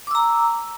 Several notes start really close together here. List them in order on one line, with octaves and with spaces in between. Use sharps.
D6 E6 A#5